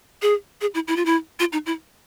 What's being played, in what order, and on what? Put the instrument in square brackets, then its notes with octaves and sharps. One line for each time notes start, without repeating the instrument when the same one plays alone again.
[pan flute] G#4
G#4
E4
E4
F4
E4
F4
D#4
E4